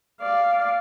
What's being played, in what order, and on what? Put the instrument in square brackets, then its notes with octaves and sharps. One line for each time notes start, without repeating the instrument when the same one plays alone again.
[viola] D5 F5